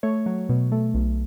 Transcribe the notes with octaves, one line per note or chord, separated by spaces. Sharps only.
A3 C#5
F#3
B2
A3
B1